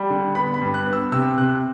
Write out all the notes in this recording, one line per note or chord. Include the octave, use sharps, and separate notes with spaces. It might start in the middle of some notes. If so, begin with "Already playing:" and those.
Already playing: G3
D3
B3 B5
B5
G2
F#6
B3
E6
C3 E6
C3 F#6